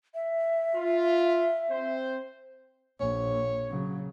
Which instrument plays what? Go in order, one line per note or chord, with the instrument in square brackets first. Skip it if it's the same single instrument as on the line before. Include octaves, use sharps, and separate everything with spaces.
[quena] E5
[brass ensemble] F4
C4 C5
[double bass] A#1 [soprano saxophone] C#5
[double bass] C#3 F#3